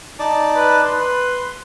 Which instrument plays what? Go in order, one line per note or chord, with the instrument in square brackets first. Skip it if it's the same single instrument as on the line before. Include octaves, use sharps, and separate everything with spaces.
[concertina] D#4 D5 A5
[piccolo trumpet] B4
[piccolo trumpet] B4 [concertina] C6